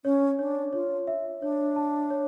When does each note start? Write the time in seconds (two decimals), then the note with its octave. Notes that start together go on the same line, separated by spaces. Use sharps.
0.05 C#4 C#5
0.39 D4 C#5
0.73 F4 C#5
1.07 E5
1.42 D4 C#5
1.76 A5
2.10 C#5